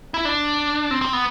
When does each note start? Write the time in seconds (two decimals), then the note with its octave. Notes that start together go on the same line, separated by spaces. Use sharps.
0.14 E4
0.25 D4
0.91 C4
1.02 C4
1.13 B3